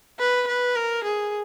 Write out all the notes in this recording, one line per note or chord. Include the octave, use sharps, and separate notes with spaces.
B4
B4
A#4
G#4